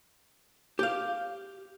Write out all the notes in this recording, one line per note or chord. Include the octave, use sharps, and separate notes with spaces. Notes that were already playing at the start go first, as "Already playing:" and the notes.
G4 F5